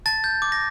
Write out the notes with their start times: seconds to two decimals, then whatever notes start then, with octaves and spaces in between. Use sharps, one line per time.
0.06 A5 A6
0.24 G6
0.42 D6
0.52 A#6